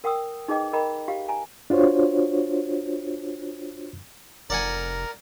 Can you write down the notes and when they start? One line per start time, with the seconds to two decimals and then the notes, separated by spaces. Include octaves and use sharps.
0.04 A#4 F#5 G5 D#6 E6
0.48 D#4 G#4 B4 D#5 G5 D6
0.73 A#4 D#5 G5 A#5 B5
1.08 G4 F5
1.29 G#5 A#5
1.70 D4 F4 F#4 C5 C#5
4.50 F1 A#4 D5 F#5 G#5 A#5